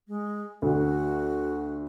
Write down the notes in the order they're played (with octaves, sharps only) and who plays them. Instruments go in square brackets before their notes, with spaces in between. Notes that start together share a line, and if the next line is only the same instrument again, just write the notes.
[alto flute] G#3
[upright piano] D2 [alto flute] F#4